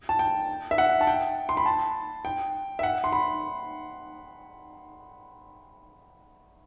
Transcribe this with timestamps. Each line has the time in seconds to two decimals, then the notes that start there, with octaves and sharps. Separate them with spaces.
0.09 A5
0.19 G5
0.71 E5
0.78 F#5
1.01 A5
1.07 G5
1.49 C6
1.57 B5
1.66 A5
2.25 G5
2.79 E5
2.83 F#5
3.04 C6
3.13 B5